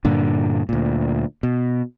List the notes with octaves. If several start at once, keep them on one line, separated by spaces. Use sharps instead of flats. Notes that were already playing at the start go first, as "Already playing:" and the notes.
G2 A#2 D3
D2 A#2
B2